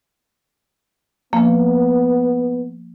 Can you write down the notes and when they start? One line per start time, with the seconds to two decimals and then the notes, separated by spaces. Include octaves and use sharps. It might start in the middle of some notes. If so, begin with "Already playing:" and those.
1.33 F3 A#3 B3